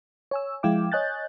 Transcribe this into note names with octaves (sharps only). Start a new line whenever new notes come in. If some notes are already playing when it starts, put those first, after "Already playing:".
C#5 G#5 E6
F3 G#3 E4 F5 G5 D6
C#5 D#5 G#5 F#6 G6 A6